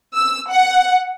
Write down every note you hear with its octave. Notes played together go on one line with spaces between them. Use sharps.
E6
F#5